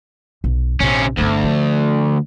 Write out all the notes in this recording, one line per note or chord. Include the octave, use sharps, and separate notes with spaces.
B1
A#1 C3 C#4
G1 D2 C4
F3